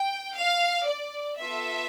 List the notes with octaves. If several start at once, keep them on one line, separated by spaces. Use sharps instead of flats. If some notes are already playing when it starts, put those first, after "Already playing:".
Already playing: G5
F5
D5
B3 F4 A4 E5